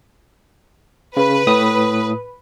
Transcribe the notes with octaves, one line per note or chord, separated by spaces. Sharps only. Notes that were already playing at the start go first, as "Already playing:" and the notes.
C#3 B4
A2 D#6